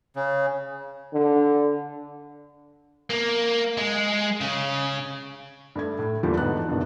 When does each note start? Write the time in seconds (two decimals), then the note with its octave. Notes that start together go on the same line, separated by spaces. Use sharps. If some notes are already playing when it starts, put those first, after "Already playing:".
0.16 C#3
1.14 D3
3.10 A#3
3.77 G#3
4.41 C#3
5.75 G2 A3 G#6
5.99 A2
6.23 E2 A#2 D3 E3 F3 G3
6.37 D2 G#2 B3 A5 F#6
6.68 F#1 G2 B2 D#3 E3